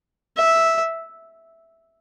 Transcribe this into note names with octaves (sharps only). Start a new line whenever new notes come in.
E5